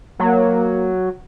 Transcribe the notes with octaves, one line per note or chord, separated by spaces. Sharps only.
F#3 A#3